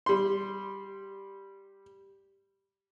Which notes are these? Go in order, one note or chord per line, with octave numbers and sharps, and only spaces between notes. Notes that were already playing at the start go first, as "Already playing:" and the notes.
G3 C6